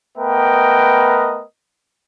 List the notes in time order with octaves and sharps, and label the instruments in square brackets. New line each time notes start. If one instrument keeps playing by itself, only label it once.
[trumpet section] A3 B3 A#4 B4 D#5 G5